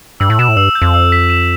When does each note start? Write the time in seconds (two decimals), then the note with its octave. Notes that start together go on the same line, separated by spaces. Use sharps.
0.20 G2 E6
0.30 A2
0.39 B2 E7
0.49 A2
0.56 G2 E6
0.75 G6
0.82 F2
0.94 E6
1.12 B6
1.30 E7